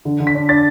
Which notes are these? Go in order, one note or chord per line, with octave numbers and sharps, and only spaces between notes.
D3
D3
B6
D4
D4 A6